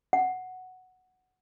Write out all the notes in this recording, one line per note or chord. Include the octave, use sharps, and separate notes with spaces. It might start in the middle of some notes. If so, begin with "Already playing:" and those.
F#5